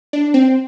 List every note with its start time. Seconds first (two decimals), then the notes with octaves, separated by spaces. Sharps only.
0.13 D4
0.34 C4